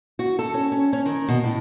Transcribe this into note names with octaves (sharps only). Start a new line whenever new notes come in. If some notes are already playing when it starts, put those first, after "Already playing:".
F#4
A4
C#4
C#4
C#4
D#3
B2
A2